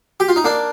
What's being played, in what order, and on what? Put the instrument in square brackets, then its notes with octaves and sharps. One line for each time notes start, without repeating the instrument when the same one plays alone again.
[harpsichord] G4
F4
D#4
A#3 D4